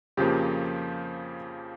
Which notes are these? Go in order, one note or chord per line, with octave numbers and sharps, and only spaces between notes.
F2 C#3 F3 A#3 G4